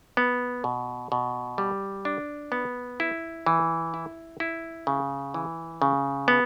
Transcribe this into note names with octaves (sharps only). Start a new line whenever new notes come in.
B3
B2
B2
G3
D4
B3
E4
E3
E4
E4
C#3
E3
C#3
B3